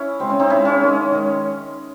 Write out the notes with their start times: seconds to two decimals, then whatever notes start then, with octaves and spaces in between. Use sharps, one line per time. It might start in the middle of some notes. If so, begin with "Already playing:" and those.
Already playing: C#4 E4
0.20 C#3 G#3 C4
0.30 C#4
0.39 C4 D#4
0.50 C#3 G#3 C#4 E4
0.65 C#4
0.81 D#3 G#3
1.12 D#3 G#3